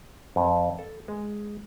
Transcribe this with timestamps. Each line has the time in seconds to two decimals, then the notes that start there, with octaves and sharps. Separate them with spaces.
0.36 F2
0.79 A4
1.08 G#3